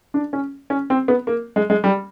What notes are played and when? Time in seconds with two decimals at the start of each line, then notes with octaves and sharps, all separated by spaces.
0.14 D4
0.33 C#4
0.70 C#4
0.90 C4
1.08 B3
1.27 A#3
1.56 G#3
1.70 G#3
1.84 G3